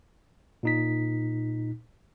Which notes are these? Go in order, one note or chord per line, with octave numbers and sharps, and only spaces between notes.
A#2 D#4 B6